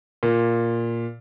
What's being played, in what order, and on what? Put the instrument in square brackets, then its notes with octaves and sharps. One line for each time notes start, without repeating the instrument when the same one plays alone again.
[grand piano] A#2